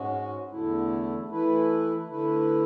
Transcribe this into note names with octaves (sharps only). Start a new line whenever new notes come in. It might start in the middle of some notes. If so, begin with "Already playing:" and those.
Already playing: G#2 G#3 C#4 F#4
E2 D3 A3 E4
E3 A3 E4 B4
D3 A3 E4 B4